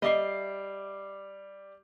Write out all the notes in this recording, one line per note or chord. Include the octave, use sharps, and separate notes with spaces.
G3 D#5 E5 D6 C7